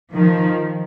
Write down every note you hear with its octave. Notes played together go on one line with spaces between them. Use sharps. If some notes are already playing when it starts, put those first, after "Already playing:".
D#3 F3